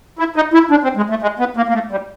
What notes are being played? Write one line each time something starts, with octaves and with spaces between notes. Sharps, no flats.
E4
D#4
E4
D4
C4
G#3
A3
G#3
B3
A#3
A#3
A3
G3